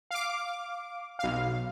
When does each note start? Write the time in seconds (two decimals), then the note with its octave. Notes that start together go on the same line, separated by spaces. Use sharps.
0.11 F5 D6
1.19 B1 F5